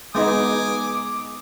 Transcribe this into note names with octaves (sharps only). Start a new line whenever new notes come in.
G#3 B3 D#4 G#5 D6 D#6